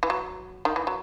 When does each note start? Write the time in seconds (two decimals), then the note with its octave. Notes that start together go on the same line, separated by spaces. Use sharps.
0.03 E3
0.10 F#3
0.65 D#3
0.76 E3
0.87 F#3